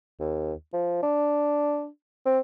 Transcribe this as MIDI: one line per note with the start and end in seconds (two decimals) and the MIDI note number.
0.20 0.53 39
0.73 1.00 53
1.03 1.87 62
2.25 2.39 60